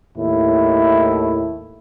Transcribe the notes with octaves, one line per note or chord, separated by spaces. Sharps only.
D#2 A2 E4